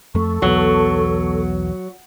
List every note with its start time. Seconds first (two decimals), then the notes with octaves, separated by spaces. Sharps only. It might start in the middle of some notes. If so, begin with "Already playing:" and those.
0.15 F2 A3 A4 C#6
0.42 B1 E2 F#3 B3